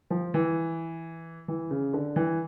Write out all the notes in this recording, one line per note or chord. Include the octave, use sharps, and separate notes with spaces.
F3
E3
E3
C#3
D3
E3